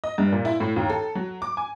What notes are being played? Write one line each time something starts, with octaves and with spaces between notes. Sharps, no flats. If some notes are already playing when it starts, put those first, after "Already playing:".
D#5
G2
A#2
E4
A2
D#2
A4
F#3
D6
G#5